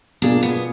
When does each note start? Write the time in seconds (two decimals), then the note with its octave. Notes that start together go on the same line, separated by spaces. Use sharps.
0.22 B2 A#3 D4 F4 G#4
0.43 B3